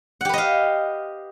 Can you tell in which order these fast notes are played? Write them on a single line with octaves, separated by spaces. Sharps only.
F#5 G4 B4 D#5 F5